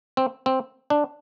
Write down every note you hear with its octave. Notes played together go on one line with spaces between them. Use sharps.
C4
C4
D4